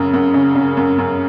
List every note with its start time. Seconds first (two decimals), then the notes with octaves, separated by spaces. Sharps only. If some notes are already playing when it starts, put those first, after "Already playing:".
Already playing: F#2 C#3
0.14 F#2
0.34 C#3
0.55 C#3
0.77 F#2
0.98 F#2